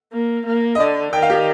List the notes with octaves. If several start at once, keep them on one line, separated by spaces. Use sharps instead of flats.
A#3
A#3
D#5
D3 D5
D#3 G5
F5
G4